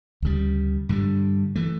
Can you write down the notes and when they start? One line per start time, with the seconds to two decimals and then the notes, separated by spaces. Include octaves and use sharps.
0.22 D2 C#3 G3
0.89 G2 D3 G3
1.55 E3 A3